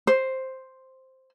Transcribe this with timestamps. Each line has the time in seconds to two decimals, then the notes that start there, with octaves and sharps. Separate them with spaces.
0.07 C5